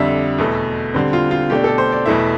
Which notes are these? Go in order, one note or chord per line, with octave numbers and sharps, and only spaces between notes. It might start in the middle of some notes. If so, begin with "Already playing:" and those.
Already playing: F2 D3 G3 D4 E5
E2 B2 A3
D3 G3 C4
F4
F4
B2 A3 D4 G4
A4
C5
D5
E2 B2 A3 E4 E5